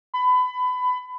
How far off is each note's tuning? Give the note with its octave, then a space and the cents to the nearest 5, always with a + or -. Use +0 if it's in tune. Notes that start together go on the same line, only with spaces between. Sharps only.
B5 +25